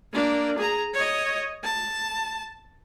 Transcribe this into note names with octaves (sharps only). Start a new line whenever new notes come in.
A#3 D4
G#4 A#5
C#5 D#5
A5